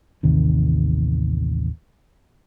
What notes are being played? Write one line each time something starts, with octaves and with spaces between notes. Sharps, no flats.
A1 D#2 C3 D#3